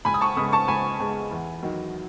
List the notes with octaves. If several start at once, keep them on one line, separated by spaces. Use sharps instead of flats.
C#2 G#5 B5
D#6
A5 C#6
C#3 G#3 B3 B5 D#6
A5 C#6
C#2 G#5 B5
C#3 G#3 B3
E2
D#3 F#3